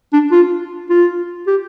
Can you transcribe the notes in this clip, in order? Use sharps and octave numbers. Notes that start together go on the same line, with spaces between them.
D4
F4
F4
G4